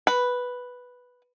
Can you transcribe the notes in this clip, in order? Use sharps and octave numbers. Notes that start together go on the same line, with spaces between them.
B4